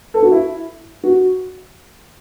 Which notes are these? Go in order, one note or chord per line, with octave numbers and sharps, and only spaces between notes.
A4
F#4
E4
F#4